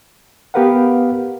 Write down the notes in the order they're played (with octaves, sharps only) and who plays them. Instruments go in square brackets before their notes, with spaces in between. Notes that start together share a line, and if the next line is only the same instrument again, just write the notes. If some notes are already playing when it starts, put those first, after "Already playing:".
[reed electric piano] B3 G4 A#4 B4 F5 F#5